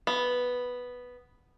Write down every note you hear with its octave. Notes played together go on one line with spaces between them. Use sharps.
B3